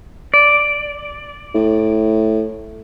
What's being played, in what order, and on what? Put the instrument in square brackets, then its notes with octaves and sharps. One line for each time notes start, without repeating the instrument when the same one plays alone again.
[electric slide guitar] D5
[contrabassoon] A2